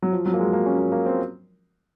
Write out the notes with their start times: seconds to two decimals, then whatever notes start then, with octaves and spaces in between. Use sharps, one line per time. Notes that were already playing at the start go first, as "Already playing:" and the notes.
0.02 F#3
0.13 F3
0.26 F#3
0.33 A#3
0.39 G#3
0.53 A#3
0.66 C#4
0.79 A#3
0.92 A#3
1.06 C4